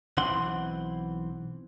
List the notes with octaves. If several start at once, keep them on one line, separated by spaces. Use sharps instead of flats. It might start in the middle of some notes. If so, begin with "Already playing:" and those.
B1 E3 C4 F#5 C6